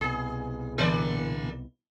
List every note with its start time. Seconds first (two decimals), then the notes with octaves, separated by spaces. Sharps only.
0.01 C2 B2 G#4
0.78 A#2 D3 E3 A#3 D5